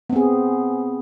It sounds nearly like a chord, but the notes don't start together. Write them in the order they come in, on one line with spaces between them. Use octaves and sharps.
B3 C4 G#4